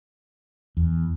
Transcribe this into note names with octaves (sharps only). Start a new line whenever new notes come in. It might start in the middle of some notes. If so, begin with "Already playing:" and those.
E2